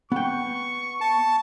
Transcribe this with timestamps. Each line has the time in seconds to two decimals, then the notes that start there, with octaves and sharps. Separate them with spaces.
0.12 B3 G5 C#6
1.01 A5